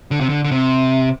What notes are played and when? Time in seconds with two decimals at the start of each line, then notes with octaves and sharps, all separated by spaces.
0.11 D3
0.20 C3
0.29 D3
0.44 D3
0.51 C3